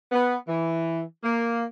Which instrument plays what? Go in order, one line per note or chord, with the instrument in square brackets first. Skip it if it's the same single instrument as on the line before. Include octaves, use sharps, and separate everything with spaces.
[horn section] B3
E3
A#3